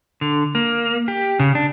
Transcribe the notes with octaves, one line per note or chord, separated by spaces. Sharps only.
D3
A#3
G4
C#3
D4